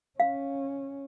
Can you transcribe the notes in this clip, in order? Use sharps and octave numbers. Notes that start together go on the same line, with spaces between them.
C#4 F5